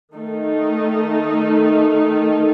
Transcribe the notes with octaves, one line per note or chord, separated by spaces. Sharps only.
D#3 A3 D#4 A4